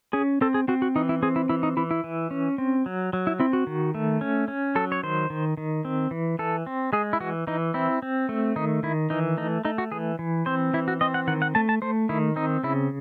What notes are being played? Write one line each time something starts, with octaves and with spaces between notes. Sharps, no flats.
C#4 G#4
C4 A4
G#4
C4 F#4
F#4
E3 D#4
E4
C4 G#4
E4
E3 E4
D#4
E3 E4
E4
E3
C#4
C4
F#3
F#3
E4
C4 E4
F#4
D#3
A3
C#4
C#4
F#3 A4
C#5
D#3 C5
D#3
D#3
C4
E3
E3 A4
C4
G#3 G#4
E4
E3 F#4
E3 D#4
C4 E4
C4
A3
D#3 D#4
D#3 E4
E3 D#4
A3 D#4
A3 D#4
F#4
E3 G#4
E3
C4 C5
E3 E4
F#4
C4 D#5
F#5
D#3 F#5
F#5
A3 A5
A5
A3 C5
D#3 E4
C4 D#4
C#3 E4